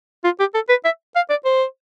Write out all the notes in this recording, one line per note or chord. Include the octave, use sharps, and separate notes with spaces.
F4
G4
A4
B4
E5
F5
D5
C5